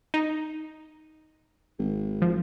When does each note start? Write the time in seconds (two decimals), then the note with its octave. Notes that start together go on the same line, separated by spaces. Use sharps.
0.14 D#4
1.79 G#1
2.22 F3